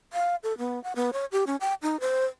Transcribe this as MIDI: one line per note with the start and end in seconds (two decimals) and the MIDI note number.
0.13 0.36 77
0.43 0.56 69
0.58 0.82 59
0.84 0.92 78
0.96 1.10 59
1.13 1.25 73
1.32 1.44 67
1.47 1.56 61
1.61 1.74 79
1.82 2.00 63
2.00 2.25 72